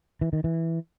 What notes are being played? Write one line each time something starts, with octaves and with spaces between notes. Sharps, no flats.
E3
D#3
E3